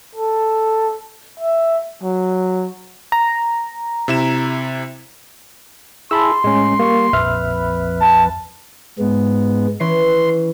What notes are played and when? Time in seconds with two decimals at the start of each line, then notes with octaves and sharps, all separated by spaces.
0.15 A4
1.39 E5
2.03 F#3
3.12 A#5
4.08 C3 E4 E7
6.11 E4 G#4 A5 B5 C6 E6
6.44 A2 G#3 C#4
6.79 G3 A#3 C#6
7.13 A#1 F2 B4 E5 F6
8.01 A5
8.99 G#2 G#3 B3
9.80 E3 C#4 C6